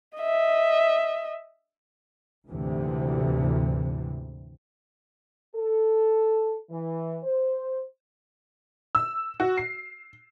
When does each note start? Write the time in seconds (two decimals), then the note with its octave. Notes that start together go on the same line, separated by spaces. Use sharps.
0.18 D#5 E5
2.48 D2 G#2 C3 E3
5.55 A4
6.70 E3
7.23 C5
8.95 E6
9.40 F#4
9.58 C7